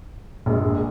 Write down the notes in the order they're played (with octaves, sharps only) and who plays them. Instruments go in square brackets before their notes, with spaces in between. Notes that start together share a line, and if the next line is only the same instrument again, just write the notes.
[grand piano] A#1 A#2 G#3